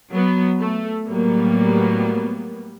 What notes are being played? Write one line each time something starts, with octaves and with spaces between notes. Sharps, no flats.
F#3 B3
A3
A2 F#3 G3 A#3 B3